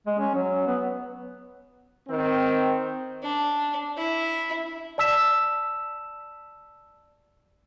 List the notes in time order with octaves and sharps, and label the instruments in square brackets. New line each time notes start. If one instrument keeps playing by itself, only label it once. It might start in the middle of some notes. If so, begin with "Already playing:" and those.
[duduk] G#3
C#4
F#3
B3
[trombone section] D#3 C4
[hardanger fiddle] D4
E4
[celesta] D5 A5 E6 B6 E7